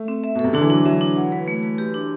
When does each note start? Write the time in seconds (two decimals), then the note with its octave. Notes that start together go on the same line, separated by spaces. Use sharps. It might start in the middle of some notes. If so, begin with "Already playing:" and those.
Already playing: A3
0.08 C4
0.24 E5
0.35 B2
0.39 A4
0.44 C3
0.53 D3 D4
0.61 E3
0.70 F#3 D4
0.85 F#3 E5
1.01 D4
1.17 F#5
1.32 B4
1.48 A3
1.63 B4
1.78 G4
1.94 D4